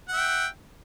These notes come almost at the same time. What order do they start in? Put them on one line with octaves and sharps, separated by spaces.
F#5 E5 G5